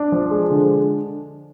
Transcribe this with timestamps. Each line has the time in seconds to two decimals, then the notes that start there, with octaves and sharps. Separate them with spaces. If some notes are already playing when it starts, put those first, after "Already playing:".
Already playing: D4
0.12 F3
0.31 G#3
0.50 D3